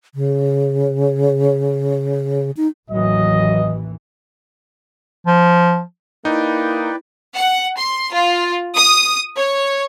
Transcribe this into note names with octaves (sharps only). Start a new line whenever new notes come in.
C#3
D#4
A1 D#2 E3 F#3 D#5
F3
A#3 D#4 E4 B4 D5 G5
F#5
C6
F4
D#6
C#5